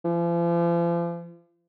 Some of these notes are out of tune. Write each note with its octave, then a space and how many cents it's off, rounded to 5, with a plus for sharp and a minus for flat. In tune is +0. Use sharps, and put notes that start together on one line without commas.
F3 -40